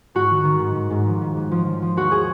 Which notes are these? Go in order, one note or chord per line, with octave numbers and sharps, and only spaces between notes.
G#2 F#4
D#3
D#3
G#2
G#2
G#2
F3
G#2
G#2
F3
F3
F3
D#2 F#4
G#4